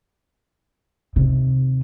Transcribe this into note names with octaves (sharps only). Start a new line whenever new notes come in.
D#2 C3